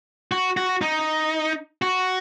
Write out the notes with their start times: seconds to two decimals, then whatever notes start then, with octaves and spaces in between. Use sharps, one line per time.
0.32 F#4
0.57 F#4
0.82 D#4
1.82 F#4